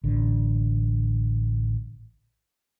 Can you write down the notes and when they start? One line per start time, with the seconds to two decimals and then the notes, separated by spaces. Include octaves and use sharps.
0.04 A1 D3